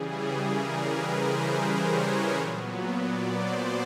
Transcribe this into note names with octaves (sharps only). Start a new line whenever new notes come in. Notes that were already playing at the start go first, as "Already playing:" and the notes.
Already playing: C#3 E3 G3 G#4
A#4
B4
C5
C5
C#5
A#2 F#3 B3
D5
C5